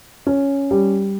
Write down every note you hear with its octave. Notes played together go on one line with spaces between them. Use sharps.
C#4
G3